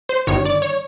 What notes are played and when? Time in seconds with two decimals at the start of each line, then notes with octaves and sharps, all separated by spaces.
0.09 C5
0.27 G1 G2 D#3 C#5
0.45 D5
0.62 C#5